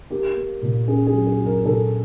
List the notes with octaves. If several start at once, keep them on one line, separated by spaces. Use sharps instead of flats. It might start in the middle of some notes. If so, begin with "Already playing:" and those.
A#3 G4
A#3
A#2
C#4 G#4
G#4
F#3
G#4
F#3
A#4
A#2 A4